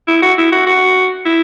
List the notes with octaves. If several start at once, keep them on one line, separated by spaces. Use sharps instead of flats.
E4
F#4
E4
F#4
F#4
E4